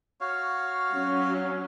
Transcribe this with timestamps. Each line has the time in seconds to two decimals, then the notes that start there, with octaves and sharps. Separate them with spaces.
0.21 F#4 C#5 F5
0.95 F#3 C#4